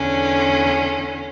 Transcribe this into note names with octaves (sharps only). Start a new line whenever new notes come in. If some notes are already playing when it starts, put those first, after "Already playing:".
Already playing: E2 D3 C#4